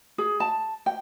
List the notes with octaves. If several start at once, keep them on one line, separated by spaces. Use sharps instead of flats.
G#4
A5
G5